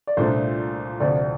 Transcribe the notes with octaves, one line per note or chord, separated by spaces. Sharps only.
D5
C2 A#2 A3 D4 C5
D2 C3 F3 D5